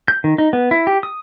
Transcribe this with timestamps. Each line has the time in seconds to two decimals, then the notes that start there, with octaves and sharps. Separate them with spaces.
0.08 G6
0.24 D#3
0.38 D#4
0.53 B3
0.71 E4
0.87 G4
1.03 D#6